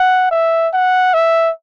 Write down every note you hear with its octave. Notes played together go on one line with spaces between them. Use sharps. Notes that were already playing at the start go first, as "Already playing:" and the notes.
Already playing: F#5
E5
F#5
E5